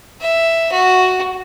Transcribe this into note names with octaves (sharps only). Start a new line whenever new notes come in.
E5
F#4